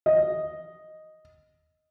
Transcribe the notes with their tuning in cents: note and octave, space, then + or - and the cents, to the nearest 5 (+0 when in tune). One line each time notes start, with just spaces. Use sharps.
D#5 +0